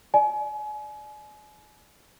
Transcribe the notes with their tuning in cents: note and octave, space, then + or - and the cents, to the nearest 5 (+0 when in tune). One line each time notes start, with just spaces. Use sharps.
D5 +15 G#5 +35